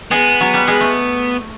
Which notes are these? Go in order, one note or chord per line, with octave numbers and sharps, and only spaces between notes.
G#3 B3
F#3
G3
G#3
A3